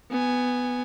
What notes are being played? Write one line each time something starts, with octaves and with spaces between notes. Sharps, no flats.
B3 G#5